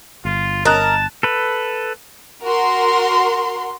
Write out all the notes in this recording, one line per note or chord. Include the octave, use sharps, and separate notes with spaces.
G1 F4
A#4 D#5 A5 D#6 F#6
A4 B4
F#4 A#4 C6